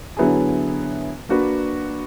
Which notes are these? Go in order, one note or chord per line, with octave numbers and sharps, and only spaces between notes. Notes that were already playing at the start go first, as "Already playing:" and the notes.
D3 F#3 B3 E4 G#4
A#3 D4 F#4 B4